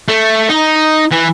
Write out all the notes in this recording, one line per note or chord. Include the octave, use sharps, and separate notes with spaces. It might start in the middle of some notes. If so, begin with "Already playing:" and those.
A3
D#4
E3